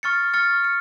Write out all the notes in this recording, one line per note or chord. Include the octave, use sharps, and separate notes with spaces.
C#6 F6 A6 C#7
C#6 F6 A6 C#7
C#7